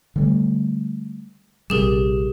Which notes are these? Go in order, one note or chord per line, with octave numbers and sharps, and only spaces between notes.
D3 G3 A3
A#1 C3 G3 G4 G#4 A#4